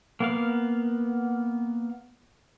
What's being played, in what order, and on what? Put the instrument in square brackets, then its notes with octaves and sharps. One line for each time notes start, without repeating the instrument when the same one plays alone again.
[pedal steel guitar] A#3 B3 F5